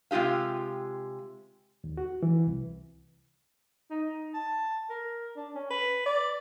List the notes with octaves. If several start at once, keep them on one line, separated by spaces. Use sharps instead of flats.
C3 G#3 F4 G4 F5
D#2
F#4
E3
C2
D#4
A5
A#4
D4
C#4
B4
D5